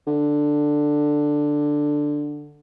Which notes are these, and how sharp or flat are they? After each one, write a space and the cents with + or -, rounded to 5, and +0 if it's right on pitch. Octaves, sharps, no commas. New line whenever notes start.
D3 +5